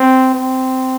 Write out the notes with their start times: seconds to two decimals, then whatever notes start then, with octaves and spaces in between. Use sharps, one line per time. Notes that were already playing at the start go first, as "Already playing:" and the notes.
Already playing: C4
0.34 C4